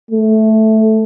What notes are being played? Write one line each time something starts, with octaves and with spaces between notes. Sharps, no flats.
A3